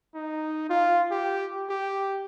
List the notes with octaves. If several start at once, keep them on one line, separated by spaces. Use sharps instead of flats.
D#4
F4
G4
G4